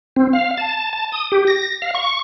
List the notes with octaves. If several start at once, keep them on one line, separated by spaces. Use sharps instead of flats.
C4
F5
A5
A5
D#6
G4
A#6
F5
C#6